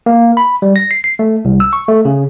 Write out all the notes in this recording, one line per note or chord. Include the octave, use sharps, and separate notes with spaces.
A#3
B5
G3
A#6
C7
C7
A3
C2
E6
C#6
A3
C#3